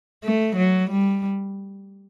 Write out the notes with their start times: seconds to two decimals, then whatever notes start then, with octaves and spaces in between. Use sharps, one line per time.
0.24 A3
0.57 F#3
0.91 G3